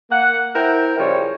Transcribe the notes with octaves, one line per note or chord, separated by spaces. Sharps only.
A#3 F#5
E4 A#4 C5 G5
C#3 F3 G3 C#5